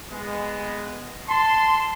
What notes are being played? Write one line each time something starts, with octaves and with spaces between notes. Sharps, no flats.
G#3 B3
A5 C6